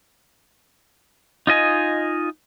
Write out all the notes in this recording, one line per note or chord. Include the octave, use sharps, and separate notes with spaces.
D#4 F4 D#5 G#5